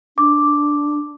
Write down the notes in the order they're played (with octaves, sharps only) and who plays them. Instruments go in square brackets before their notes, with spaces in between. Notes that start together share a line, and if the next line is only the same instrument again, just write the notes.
[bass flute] D4 [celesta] D6